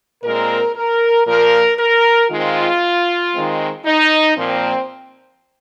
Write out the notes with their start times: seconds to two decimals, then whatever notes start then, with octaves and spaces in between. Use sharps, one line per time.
0.23 A#2 G#3 C4 A#4
0.75 A#4
1.27 A#2 F3 A#3 A#4
1.79 A#4
2.30 D#3 G#3 C4 F4
3.33 D#3 G#3 C4
3.86 D#4
4.37 A#2 F3 A#3 C4